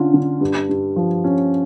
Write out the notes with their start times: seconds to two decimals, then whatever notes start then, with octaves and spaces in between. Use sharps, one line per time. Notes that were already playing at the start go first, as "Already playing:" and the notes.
Already playing: D3 C#4 F4
0.14 D3
0.41 G2
0.69 G2
0.96 F3
1.24 C#4